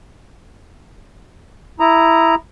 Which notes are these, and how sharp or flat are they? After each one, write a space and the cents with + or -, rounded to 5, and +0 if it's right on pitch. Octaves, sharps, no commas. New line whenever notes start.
E4 +0 A#5 +0 D#6 +0